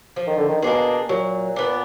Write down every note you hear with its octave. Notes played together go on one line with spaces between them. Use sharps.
F3
D#3
D3
D#3
B2 A#3 D4 G#4
A#2 F#3
B3 D4